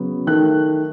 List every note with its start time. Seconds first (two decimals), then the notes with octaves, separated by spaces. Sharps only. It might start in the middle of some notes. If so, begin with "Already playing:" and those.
Already playing: C#3 F#3 B3
0.27 D#3 A3 F#6